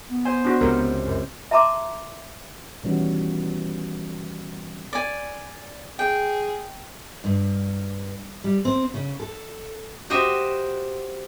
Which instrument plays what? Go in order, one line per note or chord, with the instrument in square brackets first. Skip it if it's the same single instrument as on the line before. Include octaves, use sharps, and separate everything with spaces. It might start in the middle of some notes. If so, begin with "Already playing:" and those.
[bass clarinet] B3
[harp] C5 [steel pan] G#5
[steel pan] D4 F#4
[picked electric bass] C#2 C3 [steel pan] A#4
[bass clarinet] F#2
[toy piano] E5 A5 A#5 C6 D6
[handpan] B2 D#3 E3 G3 C#4 F#4
[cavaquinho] D5 G#5
[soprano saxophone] G#4 [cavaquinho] G5
[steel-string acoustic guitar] G2
G3
C4
C#3
A4
[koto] F#4 G4 C5 D#5 E5